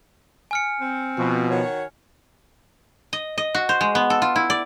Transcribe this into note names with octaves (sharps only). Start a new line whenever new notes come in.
G#5 F6 C#7
C4
B2 F3
D#3 F#4 C#5
D#5
D#5
F#4
C5
G#3
B3
A4
F4
E4
D5